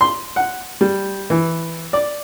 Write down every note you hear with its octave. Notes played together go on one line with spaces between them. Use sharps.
C6
F#5
G3
E3
D5